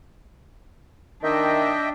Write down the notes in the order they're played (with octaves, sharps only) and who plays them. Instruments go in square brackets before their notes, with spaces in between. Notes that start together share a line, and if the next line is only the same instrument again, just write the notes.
[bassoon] D#3 [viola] D4 [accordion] D#5 E5 G5